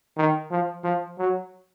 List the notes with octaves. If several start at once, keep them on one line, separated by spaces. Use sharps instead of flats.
D#3
F3
F3
F#3